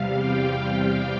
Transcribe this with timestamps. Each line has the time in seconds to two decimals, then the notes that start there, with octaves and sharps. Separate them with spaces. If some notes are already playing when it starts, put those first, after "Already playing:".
Already playing: E2 C3 G3 F5
0.15 G5